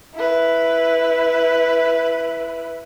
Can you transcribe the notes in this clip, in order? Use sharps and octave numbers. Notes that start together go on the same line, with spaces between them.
E4 B4